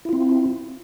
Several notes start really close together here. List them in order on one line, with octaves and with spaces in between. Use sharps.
E4 F4 C4